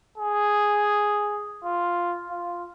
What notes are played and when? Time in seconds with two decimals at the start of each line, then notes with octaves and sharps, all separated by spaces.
0.18 G#4
1.65 F4
2.30 F4